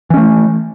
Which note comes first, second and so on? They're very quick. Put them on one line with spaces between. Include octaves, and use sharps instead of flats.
E3 C#4 A3